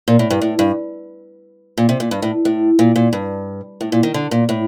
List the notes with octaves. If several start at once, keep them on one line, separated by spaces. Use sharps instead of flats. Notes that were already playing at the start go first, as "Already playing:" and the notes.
A#2
A2
G2
A2
G2
A#2
C3
A#2
G2
A2
A2
A#2
A#2
G2
A2
A#2
D#3
D3
A#2
A2